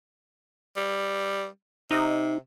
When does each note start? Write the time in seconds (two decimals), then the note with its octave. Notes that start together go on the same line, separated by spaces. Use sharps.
0.76 G3
1.91 C3 D#4